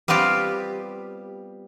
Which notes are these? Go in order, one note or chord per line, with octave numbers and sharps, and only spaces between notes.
G3 B3 C4 F4 G4